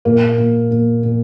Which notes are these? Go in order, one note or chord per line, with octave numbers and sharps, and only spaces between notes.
A#2 A#3
A#2
A#2
A#2